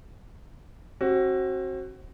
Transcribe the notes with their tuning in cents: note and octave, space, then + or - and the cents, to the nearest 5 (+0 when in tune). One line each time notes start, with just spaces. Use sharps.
C4 +35 F#4 +15